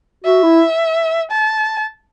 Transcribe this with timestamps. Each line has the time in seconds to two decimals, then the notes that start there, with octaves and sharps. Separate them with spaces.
0.24 F#4 E5
0.43 E4
1.31 A5